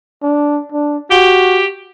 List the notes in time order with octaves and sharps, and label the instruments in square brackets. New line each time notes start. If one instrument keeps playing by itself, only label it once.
[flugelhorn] D4
D4
[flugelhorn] F#4 [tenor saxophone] G4